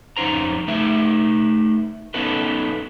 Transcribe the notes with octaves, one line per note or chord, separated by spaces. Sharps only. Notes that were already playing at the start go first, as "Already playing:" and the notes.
F2 C#4 D#4 C5 A#5
A3 D#4 B4 E5
B3 C#4 D#4 A4 B4